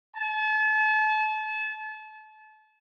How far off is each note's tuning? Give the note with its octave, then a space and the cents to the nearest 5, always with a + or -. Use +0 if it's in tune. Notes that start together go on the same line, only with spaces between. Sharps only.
A5 -35